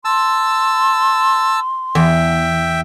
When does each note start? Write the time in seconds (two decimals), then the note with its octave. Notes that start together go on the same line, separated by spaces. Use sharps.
0.05 A5 C6 E6
1.95 E2 E5 G5